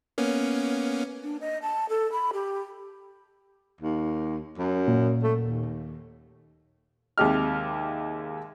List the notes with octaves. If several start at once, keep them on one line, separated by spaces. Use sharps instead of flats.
A#3 B3 C#4
D4
D#5
A5
A4
B5
G4
D#2
F#2
A#2
A3
D#2
D#2 C3 G#3 G4 D#5 F6